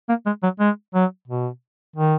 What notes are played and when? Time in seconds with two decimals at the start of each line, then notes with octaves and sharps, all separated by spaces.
0.09 A#3
0.26 G#3
0.43 F#3
0.60 G#3
0.95 F#3
1.28 B2
1.96 D#3